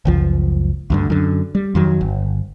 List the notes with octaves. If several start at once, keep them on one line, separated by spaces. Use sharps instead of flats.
F#1 C#2 F3
D2 G2 D3
F#2 D3
G3
F2 D#3 F#3
G1